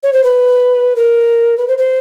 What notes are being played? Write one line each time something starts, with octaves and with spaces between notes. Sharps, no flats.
C#5
C5
B4
A#4
B4
C5
C5